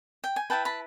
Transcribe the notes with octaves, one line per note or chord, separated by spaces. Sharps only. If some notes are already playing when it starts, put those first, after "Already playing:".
G5
G#5
E4 G4 B4 G5 A5
A5 B5